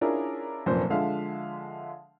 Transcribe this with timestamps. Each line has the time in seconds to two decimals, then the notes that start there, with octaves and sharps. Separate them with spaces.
0.01 C#4 D4 E4 F4 G#4 A#4
0.66 F1 F#2 A#2 C5
0.90 D3 F3 G#3 E5 F5